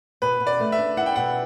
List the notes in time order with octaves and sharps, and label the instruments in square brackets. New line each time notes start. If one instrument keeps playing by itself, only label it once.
[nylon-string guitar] B2 [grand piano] B4
[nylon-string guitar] B2
[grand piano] D5
[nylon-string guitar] A3
[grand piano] E5
[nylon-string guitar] D4
[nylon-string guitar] E4 [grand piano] F#5
[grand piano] G5
[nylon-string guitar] B2 [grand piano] F#5